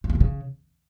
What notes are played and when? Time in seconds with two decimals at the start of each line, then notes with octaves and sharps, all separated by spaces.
0.04 F#2
0.10 E2
0.15 B2
0.20 C#3